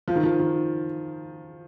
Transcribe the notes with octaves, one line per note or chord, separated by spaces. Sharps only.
F3
D#3
F3
D#3